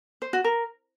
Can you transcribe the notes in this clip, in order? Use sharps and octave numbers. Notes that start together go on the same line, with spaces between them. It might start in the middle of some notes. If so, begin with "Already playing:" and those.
C5
F#4
A#4